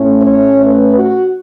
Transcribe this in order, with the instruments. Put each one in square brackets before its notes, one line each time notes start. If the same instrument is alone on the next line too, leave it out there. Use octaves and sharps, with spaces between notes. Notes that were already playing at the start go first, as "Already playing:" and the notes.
Already playing: [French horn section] A2 A3 C#4
C#5
B4
F#4